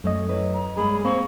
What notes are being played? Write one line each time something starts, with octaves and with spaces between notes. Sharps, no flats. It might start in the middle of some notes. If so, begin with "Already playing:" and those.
F#2 A3 C#4 D#5
F#3 E4 B4
A#5
G2 G#3 A#3 G#4 B5
A#3 C4 C#6